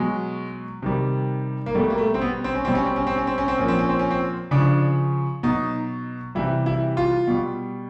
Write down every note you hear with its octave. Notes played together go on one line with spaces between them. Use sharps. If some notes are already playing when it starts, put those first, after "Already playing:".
Already playing: B2 F#3 G#3
C3 D#3 G3
A#3
B2 G3 A3
A#3
A3
C4
B3
C4
C#4
B2 G3 C4
C#4
C4
C#4
C4
C#4
C4
C#4
C4
A#2 F3 C#4
C4
C#4
C4
C#4
C4
C#3 F3 D4
B2 F#3 D#4
C3 E3 G3 E4
E4
F4
B2 G3